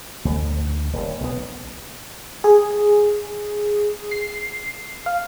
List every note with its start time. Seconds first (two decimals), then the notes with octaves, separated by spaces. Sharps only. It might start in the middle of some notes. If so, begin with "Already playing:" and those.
0.25 D2
0.93 D#1
1.20 B1 B3
2.44 G#4
4.11 C7
5.06 F5